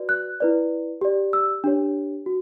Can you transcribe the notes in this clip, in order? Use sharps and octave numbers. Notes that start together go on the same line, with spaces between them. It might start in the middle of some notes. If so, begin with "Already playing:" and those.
Already playing: F#4 B4 D5
F#6
E4 B4 D5
G4 D5
E6
D4 G4 C#5
F#4